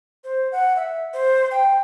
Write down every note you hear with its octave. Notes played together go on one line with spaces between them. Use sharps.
C5
F#5
E5
C5
G5